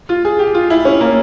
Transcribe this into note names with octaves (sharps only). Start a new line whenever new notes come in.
F4
G#4
G4
F4
E4
C#4
A#3